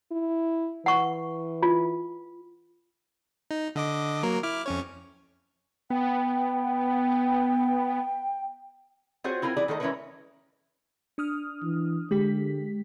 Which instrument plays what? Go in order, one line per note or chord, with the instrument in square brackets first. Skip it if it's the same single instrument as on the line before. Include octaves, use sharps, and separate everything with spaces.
[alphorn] E4
[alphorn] E3 [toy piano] F#5 C#6
[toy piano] F4
[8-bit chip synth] D#4
D3 D#5 D6
F#3 A#3 A#4
E4 D6 F6
F2 C#4 C#5
[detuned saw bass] B3 [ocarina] G5
[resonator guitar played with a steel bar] C4 F4 F#4 G#4 C5 C#5
C4 E4 F4 A#4 G#5
E3 E4 G#4 D5
D#3 A3 A4 B4 D#5
E3 G#3 C#4 E4 A#4 B4
[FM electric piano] D4 D#6 F6
[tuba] E3
[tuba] D3 [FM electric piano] G#3 G4 B6